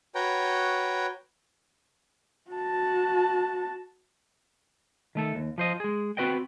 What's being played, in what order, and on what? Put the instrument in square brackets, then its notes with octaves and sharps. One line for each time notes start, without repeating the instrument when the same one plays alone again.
[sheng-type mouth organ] F#4 B4 C#5 G5 A#5
[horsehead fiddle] F#4 A5
[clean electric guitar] D#3 A3 A4
D#2
F3 C5 D#5
G#3 G#4
B3 C4 F#4 B4 D#5 G5